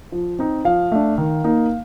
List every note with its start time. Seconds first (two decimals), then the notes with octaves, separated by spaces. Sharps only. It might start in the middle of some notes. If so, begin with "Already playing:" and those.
0.12 F3
0.39 C4 D#4
0.64 F3 F5
0.92 A3 D4
1.18 D#3
1.44 A#3 D#4